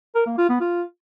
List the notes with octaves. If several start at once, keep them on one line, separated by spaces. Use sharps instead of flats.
A#4
A#3
F4
B3
F4